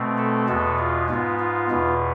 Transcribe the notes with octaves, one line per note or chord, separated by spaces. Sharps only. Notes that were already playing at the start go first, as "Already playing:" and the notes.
Already playing: B2 A3 C4
A4
E2 B2 G#3 B3 A4
F4
G#2 G#3 B3 F4
F4
E2 B2 B3